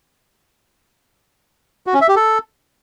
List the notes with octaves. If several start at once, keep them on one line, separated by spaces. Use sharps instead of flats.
F#4
C#4
E5
G4
A4